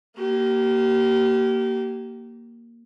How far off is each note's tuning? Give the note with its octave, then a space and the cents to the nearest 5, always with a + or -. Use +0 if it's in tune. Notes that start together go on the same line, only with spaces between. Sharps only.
A#3 +0 G4 -30